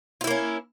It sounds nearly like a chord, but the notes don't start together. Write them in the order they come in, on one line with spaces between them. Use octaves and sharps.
F4 E4 A#3 C#4